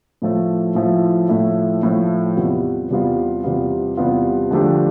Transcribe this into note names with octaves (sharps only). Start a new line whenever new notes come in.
A2 F3 A3 E4
A2 F3 A3 E4
A2 F3 A3 E4
A2 F3 A3 E4
E2 C3 G3 B3 F4
E2 C3 G3 B3 F4
E2 C3 G3 B3 F4
E2 C3 G3 B3 F4
D3 F3 A3 D4 G4